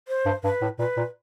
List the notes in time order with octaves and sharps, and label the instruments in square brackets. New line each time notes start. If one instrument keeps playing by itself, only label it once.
[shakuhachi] C5
[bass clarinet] G2
[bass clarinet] G2 [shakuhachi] B4
[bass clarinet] A2
[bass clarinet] A#2 [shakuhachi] B4
[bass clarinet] A#2